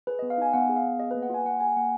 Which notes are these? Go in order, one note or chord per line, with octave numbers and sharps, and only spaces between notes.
G#4 B4
B3 D#5
F5
D#4 G#5
B3 F#5
G#4
F5
B3
G#4 D#5
A#3 B4
F#5
F4 G#5
A#3 F#5
G#4 G#5
A#3 F#5